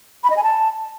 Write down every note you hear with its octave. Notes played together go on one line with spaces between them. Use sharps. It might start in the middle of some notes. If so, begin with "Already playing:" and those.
B5
D#5
G#5
A5